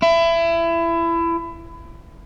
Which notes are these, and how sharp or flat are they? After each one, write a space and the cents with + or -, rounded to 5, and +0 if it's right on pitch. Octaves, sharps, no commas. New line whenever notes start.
E4 +25